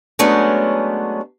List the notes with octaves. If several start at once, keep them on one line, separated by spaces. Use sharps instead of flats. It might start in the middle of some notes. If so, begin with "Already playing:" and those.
F#3 G#3 A3 B3 C#4 D4